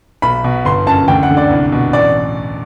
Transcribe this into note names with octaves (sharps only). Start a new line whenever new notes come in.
B1 B5
B2
G1 C6
F#2 A5
D2 G5
F#5
D3
D5
C2
B2
A1 D5